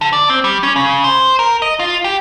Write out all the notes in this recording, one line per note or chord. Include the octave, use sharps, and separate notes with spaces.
D3
D5
C4
G3
C#4
C#3
C5
A#4
D#5
F4
G4